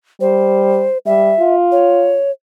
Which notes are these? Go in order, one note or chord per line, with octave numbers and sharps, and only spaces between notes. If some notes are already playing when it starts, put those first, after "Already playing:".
G3 C5
G3 E5
F4
C#5